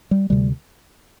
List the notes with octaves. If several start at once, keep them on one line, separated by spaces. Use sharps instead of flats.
G3
D2 C3 G3